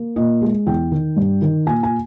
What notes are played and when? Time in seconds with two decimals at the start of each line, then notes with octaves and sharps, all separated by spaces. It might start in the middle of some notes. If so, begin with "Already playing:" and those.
Already playing: A#3
0.16 A#2 D#5
0.42 G#3
0.67 E2 G5
0.91 D#3
1.16 G2
1.42 D#3
1.66 A#2 G#5
1.83 G#5